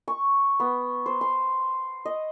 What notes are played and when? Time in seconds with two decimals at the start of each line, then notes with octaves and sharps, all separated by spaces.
0.08 C#6
0.60 B3
1.06 C5
1.21 C6
2.05 D#5